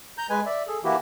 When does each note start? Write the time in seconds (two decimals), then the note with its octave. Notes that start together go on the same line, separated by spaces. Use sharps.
0.18 A#5 G6
0.30 G#3 B4 G#5
0.46 D5 E5
0.67 G#4 A4
0.84 E3 A#3 E4 F#4 G4